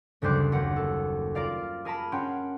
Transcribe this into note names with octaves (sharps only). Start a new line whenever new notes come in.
F#1 D2 G3 C5 D5 F#6
D#2 F#5
A4
F4 A#4 D5 F5
G#4 A#4 A5 B5
C#4 F#5 G5 C6